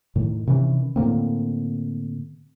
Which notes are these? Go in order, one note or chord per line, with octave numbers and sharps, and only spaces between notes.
A2 D#3
C3 D#3 E3 C#4
A2 D3 A#3 C4